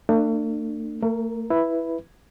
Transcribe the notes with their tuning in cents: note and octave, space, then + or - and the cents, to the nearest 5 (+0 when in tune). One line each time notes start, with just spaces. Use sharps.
A3 +45 D4 +30
A3 +40 A#4 +0
E4 +0 B4 +0